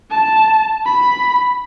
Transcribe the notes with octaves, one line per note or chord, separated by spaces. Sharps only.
A5
B5